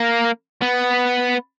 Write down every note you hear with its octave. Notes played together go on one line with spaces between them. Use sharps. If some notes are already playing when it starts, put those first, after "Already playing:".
Already playing: A#3
B3